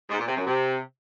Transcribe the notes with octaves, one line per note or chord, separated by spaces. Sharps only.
G#2
A#2
C3
F#2
C3